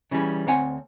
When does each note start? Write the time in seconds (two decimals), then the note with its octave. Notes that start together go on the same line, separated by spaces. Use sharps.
0.11 C#3 E3 G3 C#4
0.47 D2 C4 C#5 F#5 G#5